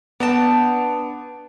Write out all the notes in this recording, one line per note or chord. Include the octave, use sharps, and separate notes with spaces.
B3 D4 G5 A5